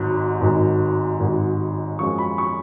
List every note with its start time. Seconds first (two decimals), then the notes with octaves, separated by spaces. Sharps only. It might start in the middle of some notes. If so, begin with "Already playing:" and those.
Already playing: G#1 G#2 F#3
0.41 G#1 G#2 F#3
1.20 G#1 G#2 F#3
1.99 F#2 F3 G#3 C#6
2.19 B5
2.38 C#6